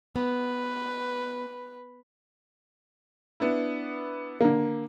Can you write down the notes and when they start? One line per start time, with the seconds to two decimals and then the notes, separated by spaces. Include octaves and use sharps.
0.16 B3 B4
3.40 B3 D4 E4
4.41 D3 A#3